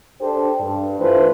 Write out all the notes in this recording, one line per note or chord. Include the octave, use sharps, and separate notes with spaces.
D4 G4 A4 C5
G2
E3 A3 D4 F4 B4 C5